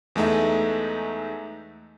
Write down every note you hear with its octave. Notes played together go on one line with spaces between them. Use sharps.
E2 G#3 A3 D#4 E5